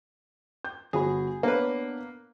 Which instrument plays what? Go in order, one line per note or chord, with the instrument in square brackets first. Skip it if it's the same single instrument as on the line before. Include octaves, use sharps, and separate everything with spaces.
[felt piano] G6
[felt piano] G1 F#4 B5 [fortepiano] G#4
[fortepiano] A#3 B4 [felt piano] B3 D4 C#5